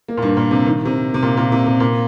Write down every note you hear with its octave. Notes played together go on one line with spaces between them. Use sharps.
A#3
A#2
G2
A#2
C3
D#3
C3
C3
A#2
A#2
C3
C3
A#2